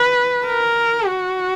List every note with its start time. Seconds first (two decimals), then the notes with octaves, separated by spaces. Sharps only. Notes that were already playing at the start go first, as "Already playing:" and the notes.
Already playing: B4
0.45 A#4
1.07 F#4